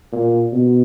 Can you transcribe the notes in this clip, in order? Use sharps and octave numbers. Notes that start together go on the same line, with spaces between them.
A#2
B2